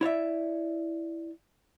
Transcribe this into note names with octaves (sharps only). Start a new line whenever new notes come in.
E4 C#5 D5 E5